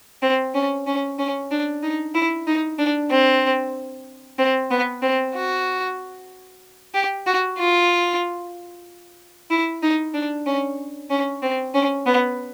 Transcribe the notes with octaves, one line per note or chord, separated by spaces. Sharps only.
C4
C#4
C#4
C#4
D4
D#4
E4
D#4
D4
C4
C4
B3
C4
F#4
G4
F#4
F4
E4
D#4
D4
C#4
C#4
C4
C#4
B3